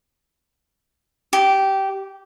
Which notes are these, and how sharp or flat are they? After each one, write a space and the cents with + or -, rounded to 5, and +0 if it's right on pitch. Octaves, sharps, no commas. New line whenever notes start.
G4 -15